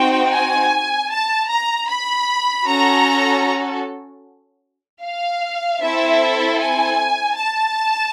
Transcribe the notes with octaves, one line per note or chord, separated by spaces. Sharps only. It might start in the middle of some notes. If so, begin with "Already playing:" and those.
Already playing: C4 D#4 F#4 G5
G#5
A5
A#5
B5
C#4 F#4 A4 A#5
F5
C4 E4 A4 E5
G#5
A5